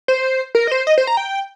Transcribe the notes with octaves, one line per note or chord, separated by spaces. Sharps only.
C5
A#4
D#5
C5
D#5
C5
A#5
G5